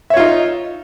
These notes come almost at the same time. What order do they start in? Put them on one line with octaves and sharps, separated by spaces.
E5 C#5 F4 D#4